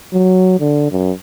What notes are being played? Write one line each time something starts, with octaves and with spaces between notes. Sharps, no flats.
F#3
D3
F#2